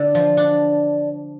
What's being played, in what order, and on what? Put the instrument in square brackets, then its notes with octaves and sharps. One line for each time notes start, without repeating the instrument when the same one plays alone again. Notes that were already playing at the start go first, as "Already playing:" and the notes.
Already playing: [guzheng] D3 [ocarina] D5
[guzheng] F3
D4